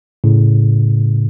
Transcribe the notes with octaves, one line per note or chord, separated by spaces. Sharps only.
A2 C#3